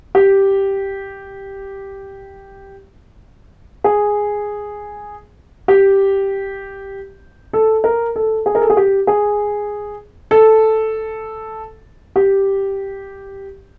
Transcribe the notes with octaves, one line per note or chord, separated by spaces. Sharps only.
G4
G#4
G4
A4
A#4
A4
G#4
A#4
A4
G#4
G4
G#4
A4
G4